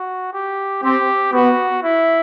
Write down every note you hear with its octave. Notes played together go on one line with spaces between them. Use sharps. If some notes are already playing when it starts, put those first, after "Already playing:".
Already playing: F#4
G4
C4 G4
B3 F#4
E4